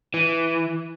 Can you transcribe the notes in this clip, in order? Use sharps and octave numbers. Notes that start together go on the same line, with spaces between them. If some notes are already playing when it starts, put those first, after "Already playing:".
E3